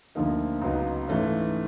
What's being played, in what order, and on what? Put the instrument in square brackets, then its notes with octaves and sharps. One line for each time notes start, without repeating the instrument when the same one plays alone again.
[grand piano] D2 D3 F3 A#3 D#4
C#2 C#3 F#3 B3 D#4
G#2 E3 A3 C#4